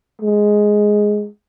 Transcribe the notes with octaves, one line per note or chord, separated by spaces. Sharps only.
G#3